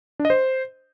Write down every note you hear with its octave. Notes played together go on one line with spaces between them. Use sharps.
D4
D#5
C5